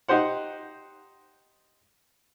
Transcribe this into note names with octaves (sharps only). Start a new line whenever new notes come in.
D#4 G4 C5 F#5